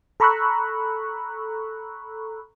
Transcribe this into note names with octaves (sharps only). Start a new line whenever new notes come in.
A4 A#5 B5 C#6 E6 F#6